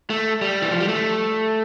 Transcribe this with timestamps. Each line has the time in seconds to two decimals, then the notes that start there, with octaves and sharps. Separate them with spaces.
0.10 A3
0.41 G3
0.62 E3
0.71 F3
0.80 G3
0.88 A3